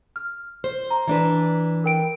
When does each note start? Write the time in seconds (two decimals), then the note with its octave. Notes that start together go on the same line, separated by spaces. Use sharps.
0.16 F6
0.64 C5
0.91 A#5
1.08 E3 D4 B4
1.84 A#4 G5 D7